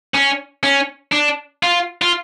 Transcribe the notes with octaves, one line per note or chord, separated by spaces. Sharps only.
C#4
C#4
D4
F4
F4